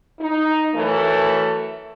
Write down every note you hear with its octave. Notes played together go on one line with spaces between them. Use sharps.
D#4
E3 F#3 A3 A4 A#4